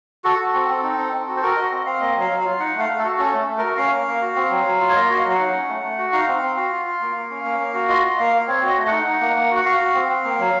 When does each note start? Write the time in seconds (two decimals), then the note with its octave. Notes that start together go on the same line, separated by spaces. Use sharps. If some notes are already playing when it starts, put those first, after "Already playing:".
0.24 F#4 A4
0.39 F#4
0.54 C4
0.69 C4
0.83 D#4
0.98 C4
1.13 C4
1.28 F#4
1.37 C5
1.42 F#4 A#4
1.56 F#4 D#5
1.71 C4
1.86 C4 F5
2.00 A#3 D#5
2.15 F#3
2.20 F5
2.31 F#3
2.40 F4 F5
2.59 D#4 F#5
2.74 A3 F5
2.89 A3
2.98 A4
3.04 F#4
3.18 C#4 A4
3.33 A3
3.48 A3
3.58 F#4 A#4
3.77 C#4 F5
3.92 A#3
4.07 A#3
4.21 F#4
4.35 C4
4.50 F#3
4.65 F#3
4.80 F4
4.89 C#5
4.95 A#3 D#5
5.09 F#4 F5
5.25 F#3
5.30 F5
5.34 D#4 F#5
5.53 C#4
5.68 A3
5.83 A3
5.98 F#4
6.13 D#4 F5
6.27 C4
6.42 C4
6.57 F#4
6.71 F4
6.86 F4
7.01 A#3
7.16 A#3
7.30 C#4
7.44 A#3
7.60 A#3
7.74 F#4
7.89 F4 D#5
8.04 F4
8.18 A#3 F5
8.33 A#3
8.47 C4 C#5
8.62 F#4 D#5
8.77 A3
8.87 D#4 F#5
9.06 D#4
9.21 A#3
9.36 A#3
9.51 F#4 F#5
9.65 F#4 F5
9.80 F#4
9.94 C4
10.09 C4
10.24 A#3
10.39 F#3